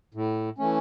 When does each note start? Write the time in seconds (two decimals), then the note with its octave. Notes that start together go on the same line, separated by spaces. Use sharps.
0.14 A2
0.58 E3 A3 C#4